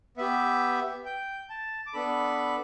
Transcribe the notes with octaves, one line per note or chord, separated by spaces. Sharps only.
B3 G4 E5
G5
A5
D6
B3 D4 A4 B5